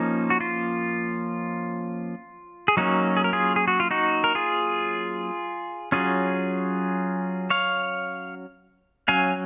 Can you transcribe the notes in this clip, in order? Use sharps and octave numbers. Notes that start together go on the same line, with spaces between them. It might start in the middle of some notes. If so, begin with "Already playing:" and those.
Already playing: F3 A#3 C#4 D#4
F#4
F4
G#4
F#3 A#3 C#4 D#4 F#4
G#4
A#4
F4 G#4
G#4
F#4
F4
D#4 F#4
A#4
F4 G#4
F#3 C#4 F4 G#4
C#5 F5
F#3 C#4 F5 G#5